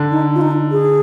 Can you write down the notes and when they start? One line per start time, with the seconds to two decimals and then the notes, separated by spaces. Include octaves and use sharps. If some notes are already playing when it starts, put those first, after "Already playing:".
Already playing: D3
0.11 D#4
0.35 F4
0.41 D#4
0.72 G#4